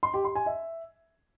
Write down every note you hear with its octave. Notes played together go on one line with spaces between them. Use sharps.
C6
G4
C6
G#5
E5